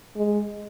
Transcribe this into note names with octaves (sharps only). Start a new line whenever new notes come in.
G#3